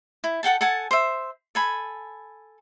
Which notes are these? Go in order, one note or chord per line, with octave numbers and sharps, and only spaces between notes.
E4
A4 F#5 G5 A5
A4 F#5 G#5 A5
C5 E5
A4 G#5 B5